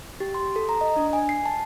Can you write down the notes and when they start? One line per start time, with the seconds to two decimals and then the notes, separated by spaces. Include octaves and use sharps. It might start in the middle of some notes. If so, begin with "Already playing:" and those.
0.20 G4
0.34 C6
0.56 A4
0.69 A#5
0.81 D#5
0.96 D4
1.13 G#5
1.29 C7
1.46 A5